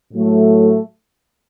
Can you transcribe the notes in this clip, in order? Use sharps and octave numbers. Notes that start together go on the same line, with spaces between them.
A2 F#3 A3